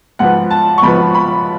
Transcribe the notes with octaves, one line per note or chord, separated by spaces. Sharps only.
G#2 F3 B3 F#5
A5
C#6
G#2 F3 B3 B5
B5